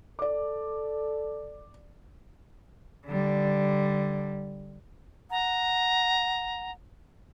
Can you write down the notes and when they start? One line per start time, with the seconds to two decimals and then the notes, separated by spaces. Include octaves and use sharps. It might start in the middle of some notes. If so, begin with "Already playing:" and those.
0.19 A4 D5 D6
3.07 D3 G3
5.31 F#5 A#5